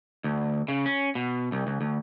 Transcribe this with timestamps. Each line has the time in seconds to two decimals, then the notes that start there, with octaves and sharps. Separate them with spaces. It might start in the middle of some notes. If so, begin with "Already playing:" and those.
0.24 D2
0.68 C#3
0.86 C#4
1.15 B2
1.52 C2
1.67 C#2
1.81 D2